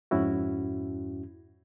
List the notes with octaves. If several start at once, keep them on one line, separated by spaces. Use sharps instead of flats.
F2 G#2 C#4 E4 F#4